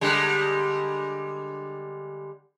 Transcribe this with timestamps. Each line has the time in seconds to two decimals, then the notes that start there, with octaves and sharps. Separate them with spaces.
0.01 D3 G3 G#3